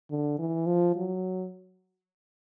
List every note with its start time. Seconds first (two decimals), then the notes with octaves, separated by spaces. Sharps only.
0.11 D3
0.39 E3
0.66 F3
0.96 F#3